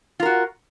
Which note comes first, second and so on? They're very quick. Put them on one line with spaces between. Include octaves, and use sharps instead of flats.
F4 A#4 F#4